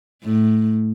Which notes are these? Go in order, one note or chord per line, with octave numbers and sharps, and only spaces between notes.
A2